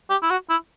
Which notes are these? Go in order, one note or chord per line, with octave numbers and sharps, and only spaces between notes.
G4
E4
F#4
E4